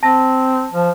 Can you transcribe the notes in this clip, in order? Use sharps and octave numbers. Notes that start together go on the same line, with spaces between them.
C4 A5 A#6
F3